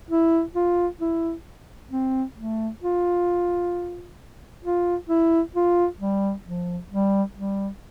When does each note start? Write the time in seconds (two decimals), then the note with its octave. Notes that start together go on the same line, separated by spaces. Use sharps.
0.11 E4
0.55 F4
1.01 E4
1.91 C4
2.37 A3
2.83 F4
4.64 F4
5.09 E4
5.55 F4
6.01 G3
6.46 F3
6.91 G3
7.37 G3